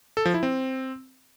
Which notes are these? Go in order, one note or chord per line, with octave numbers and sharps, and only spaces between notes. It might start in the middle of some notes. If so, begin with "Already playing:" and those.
A4
F3
E4
C4